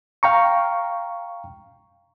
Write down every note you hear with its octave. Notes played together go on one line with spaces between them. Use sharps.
F5 G5 A#5 C#6